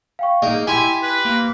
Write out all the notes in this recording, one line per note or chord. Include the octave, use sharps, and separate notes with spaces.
F5 G5 C#6
A#3 D#4 G#4
E4 G4 G5 G#5 C6 B6
B4
A#3